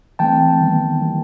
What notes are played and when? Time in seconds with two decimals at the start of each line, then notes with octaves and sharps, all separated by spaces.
0.19 E3 A3 C4 G5 A5
0.60 D#3 G3 B3
1.01 E3 G3 A#3